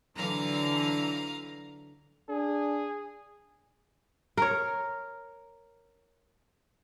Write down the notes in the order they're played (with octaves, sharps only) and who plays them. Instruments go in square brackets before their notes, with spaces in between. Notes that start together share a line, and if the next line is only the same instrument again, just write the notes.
[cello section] D3 E3 F#3 [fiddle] F5 A#5
[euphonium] D4 [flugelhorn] G#4
[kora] A#4 C#5